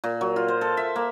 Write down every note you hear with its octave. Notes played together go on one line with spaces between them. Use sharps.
A#2
F#3
F4
C5
A4
E5
A#3